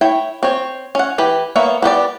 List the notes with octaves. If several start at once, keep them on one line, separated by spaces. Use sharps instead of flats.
E4 C#5 G5
C4 C#5
C#4 F#5
E3 G4 B4
A#3 B3 C#5 E5
B3 G4 B4 D5